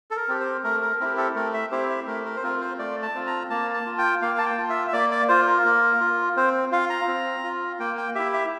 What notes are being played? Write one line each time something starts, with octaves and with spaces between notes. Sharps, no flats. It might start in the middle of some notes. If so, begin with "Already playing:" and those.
A4
A#4
C4 G4
C5
A3 A#4
A#4
C4 E4 G4 A#4
A4
A3 A#4
E5
C4 E4 G4 C5
E5
A3 A#4
A#4
C5
C4 F4 A#4
C5
A3 D5
A5
C4 F4
A#5
A#3 A5
A5
F4
G5
A#3 F5
A5
G5
F4
E5
E5
A#3 D5
D5
F4 C5
A#4
A#3
F4
C4 C5
F4 F5
A#5
C4
F4
A#3 G5
G5
E4 G4 E5
E5